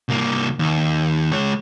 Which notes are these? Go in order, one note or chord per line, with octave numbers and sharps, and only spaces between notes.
C2 A#3
D#2
G#3 C#5